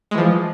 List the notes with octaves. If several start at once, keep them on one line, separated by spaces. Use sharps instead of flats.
E3 F3 G#3